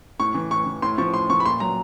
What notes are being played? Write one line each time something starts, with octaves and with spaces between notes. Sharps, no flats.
A2 C#6
E3
A2 C#6
E3
A2 C6
F3 C#6
A2 C6
F3 C#6
B5
A#2 C6
F#3 A#5